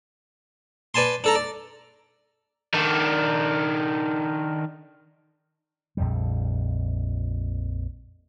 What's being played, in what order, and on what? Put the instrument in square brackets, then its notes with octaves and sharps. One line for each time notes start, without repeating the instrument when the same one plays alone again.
[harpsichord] B4 D5 G#5 A5 C6
D4 A4 A#5
D5
[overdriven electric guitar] D#3 D4
[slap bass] A#1 F2 G3